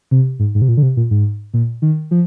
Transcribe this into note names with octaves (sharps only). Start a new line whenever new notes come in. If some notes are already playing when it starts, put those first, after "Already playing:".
C3
G#2
G#2
C3
A#2
D3
C3
A#2
G#2
A#2
D#3
F3